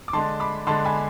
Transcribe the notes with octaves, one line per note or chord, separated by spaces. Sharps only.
D6
D3 G#3 D4 A5 C6
B5 D6
D3 G#3 D4 A5 C6
G#5 B5